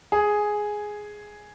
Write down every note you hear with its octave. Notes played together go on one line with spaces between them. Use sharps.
G#4